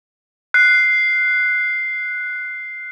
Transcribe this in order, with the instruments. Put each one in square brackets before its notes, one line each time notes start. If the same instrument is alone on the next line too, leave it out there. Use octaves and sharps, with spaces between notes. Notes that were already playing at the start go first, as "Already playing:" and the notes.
[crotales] F#6 C7